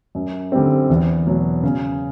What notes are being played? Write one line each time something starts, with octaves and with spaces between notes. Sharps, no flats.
F#2
D3 G3 C4
E2
B2 F#3
C#3